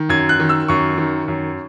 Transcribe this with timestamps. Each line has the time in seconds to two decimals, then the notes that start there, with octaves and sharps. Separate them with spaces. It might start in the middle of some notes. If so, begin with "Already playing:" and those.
Already playing: D#3
0.09 F#2 G#6
0.29 F#6
0.39 D#3
0.49 E6
0.68 F#2 C#6
0.98 D#3
1.28 F#2